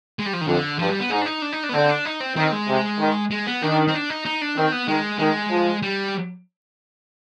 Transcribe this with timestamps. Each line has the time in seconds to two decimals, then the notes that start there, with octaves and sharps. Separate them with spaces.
0.19 G#3
0.26 G3
0.33 F3
0.41 D#3
0.47 F2 D3
0.79 G2 F3
0.89 G3
1.00 B3
1.11 G#2 D#4
1.21 D4
1.26 D#4
1.42 D4
1.52 D#4
1.63 D4
1.69 B3
1.73 D3 C4
1.89 D4
2.05 D#4
2.20 C4
2.36 D#3 C4
2.52 G#3
2.68 C3
2.99 D#3
3.31 G#3
3.47 B3
3.62 D#3 D4
3.88 C4
3.94 D4
4.10 D#4
4.25 D#4
4.41 D4
4.57 D#3 C4
4.72 B3
4.88 D#3 G#3
5.19 D#3 G#3
5.51 F3
5.83 G3